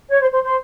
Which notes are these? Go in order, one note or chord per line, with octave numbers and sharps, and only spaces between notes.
C#5
C5
C5
C5